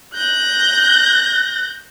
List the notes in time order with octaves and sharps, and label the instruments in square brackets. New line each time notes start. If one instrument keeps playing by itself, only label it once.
[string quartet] F#6 G6 A#6